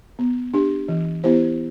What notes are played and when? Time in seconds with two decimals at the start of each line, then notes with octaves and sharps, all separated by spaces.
0.19 B3
0.54 D4 G4
0.88 E3
1.24 B3 E4 G4 C5